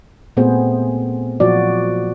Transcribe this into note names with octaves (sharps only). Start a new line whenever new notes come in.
A#2 A3 B3 C4 G#4 C5
A#2 F3 F#3 F4 F#4 D5